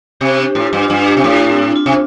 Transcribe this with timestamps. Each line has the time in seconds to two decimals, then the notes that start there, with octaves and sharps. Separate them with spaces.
0.21 C3 G4 C5
0.38 D4 G4
0.55 A2 F4
0.73 G2
0.83 F4
0.90 G2 D4
1.07 D4 G4
1.17 C3
1.24 A2 F4
1.50 C4
1.58 D4
1.72 D4
1.76 F4
1.86 C3